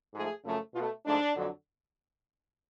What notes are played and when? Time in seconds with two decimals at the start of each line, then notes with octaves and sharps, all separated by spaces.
0.14 G#2 F3 A3 G#4
0.45 F#2 C#3 F3 A3
0.75 B2 F4
0.79 A3
1.05 G#2 F3 A3 D4
1.35 F2 D3 F#3